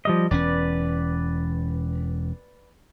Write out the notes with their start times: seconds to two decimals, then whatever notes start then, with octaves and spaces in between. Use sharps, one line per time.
0.05 F3 G3 D#5
0.31 E1 E2 C#4 B4 D5